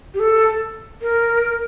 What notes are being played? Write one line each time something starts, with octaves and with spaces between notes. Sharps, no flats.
G4
A4
A#4